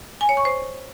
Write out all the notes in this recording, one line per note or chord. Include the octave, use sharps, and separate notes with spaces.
G#5
C#5
C#6
C5